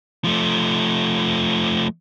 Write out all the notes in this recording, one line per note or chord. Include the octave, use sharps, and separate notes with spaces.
F3 A3